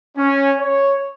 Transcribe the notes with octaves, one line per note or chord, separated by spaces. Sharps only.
C#4
C#5